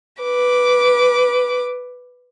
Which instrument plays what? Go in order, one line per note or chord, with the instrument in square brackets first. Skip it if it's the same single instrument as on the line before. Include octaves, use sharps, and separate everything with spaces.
[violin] B4 D6